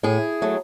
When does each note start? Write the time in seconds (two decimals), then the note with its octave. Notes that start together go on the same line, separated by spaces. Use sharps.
0.03 A2 E4 G#4
0.42 F#3 A3